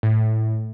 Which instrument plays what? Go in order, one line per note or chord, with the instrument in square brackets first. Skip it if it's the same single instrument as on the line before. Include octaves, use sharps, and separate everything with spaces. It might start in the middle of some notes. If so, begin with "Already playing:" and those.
[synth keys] A2